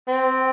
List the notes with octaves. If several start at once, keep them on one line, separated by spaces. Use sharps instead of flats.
C4